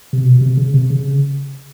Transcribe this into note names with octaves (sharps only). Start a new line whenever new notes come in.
C3
B2
C3
C#3
C3
C#3